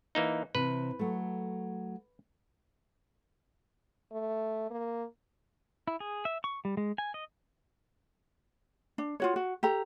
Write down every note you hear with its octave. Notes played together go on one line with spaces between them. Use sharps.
E3 A#3 D#4
C3 E3 B4
F#3 A3
A3
A#3
E4
G#4
E5
C#6
G3
G#3
G#5
D#5
D4
F4 F#4 C#5
F#4
G4 A4 A#5